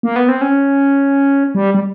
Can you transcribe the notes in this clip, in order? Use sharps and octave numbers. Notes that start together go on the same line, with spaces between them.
A#3
B3
C4
C#4
G3
G3